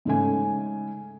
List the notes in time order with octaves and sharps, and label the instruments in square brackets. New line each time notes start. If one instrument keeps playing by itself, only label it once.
[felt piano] G#2 C#3 A3 G#5